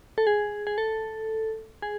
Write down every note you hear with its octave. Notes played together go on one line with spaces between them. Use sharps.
A4
G#4
G#4
A4
G#4